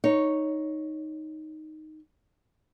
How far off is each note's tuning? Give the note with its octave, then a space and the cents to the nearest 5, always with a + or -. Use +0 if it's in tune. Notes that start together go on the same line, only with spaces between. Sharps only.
D#4 +0 C#5 +0